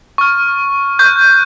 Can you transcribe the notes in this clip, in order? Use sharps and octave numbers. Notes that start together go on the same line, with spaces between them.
C#6 F6
C#6 F#6 G6